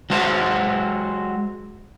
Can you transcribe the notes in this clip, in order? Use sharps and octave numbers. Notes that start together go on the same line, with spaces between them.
F#3 G#3 F#4 C5